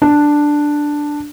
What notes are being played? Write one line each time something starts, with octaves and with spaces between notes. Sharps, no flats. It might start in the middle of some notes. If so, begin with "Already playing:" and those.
D4